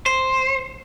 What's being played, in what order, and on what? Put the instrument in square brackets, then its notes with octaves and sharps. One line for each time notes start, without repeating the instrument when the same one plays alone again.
[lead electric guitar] C5